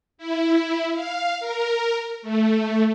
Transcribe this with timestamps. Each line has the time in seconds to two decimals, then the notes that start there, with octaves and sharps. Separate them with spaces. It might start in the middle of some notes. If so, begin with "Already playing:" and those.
0.18 E4
0.94 F5
1.40 A#4
2.22 A3